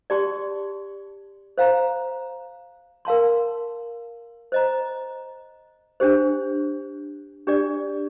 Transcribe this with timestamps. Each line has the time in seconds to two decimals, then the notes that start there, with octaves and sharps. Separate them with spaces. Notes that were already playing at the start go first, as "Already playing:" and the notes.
0.10 G4 D5 A5 C6
1.58 C5 F5 A#5
3.05 A#4 F5 A5 C6
4.52 C5 D#5 A#5
6.00 D4 G4 C5
7.47 D4 G4 D5